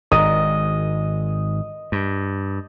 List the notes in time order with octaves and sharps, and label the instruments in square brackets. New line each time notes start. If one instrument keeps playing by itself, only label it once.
[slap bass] G#1 G#2 [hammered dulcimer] D#5
[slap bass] G2